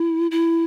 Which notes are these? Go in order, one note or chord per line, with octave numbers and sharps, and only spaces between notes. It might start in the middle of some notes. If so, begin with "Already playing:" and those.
Already playing: E4
E4